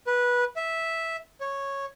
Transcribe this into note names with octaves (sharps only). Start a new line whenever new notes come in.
B4
E5
C#5